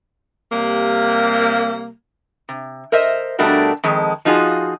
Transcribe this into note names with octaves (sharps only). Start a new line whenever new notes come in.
C3 G3 A#3
C3
A#4 C5 D#5 E5
B2 G3 A3 D4 F#4 A#4
F2 D#3 G#3
F3 D#4 F4 F#4 G#4